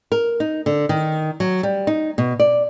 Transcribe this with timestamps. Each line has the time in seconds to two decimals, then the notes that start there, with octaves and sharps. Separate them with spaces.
0.12 A#4
0.40 D#4
0.66 D3
0.89 D#3
1.40 F#3
1.63 G3
1.87 D#4
2.18 B2
2.40 D5